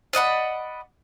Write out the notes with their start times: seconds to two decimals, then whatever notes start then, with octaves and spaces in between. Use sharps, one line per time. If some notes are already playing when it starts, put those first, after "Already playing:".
0.13 D5 D#5 F#5 B5